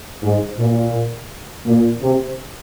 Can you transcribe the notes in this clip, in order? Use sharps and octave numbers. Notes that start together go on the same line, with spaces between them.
G#2
A#2
A#2
C3